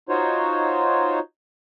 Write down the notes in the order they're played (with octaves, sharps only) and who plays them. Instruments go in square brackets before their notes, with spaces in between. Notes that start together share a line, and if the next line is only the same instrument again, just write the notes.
[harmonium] D#4 F4 F#4 C5 C#5